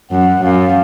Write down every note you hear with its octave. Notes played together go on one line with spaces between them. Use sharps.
F#2 F#5
F#2 F5